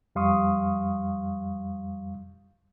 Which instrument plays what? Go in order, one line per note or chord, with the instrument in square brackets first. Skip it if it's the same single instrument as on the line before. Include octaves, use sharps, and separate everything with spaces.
[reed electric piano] F2 G3 F5 C6 C#6 D#6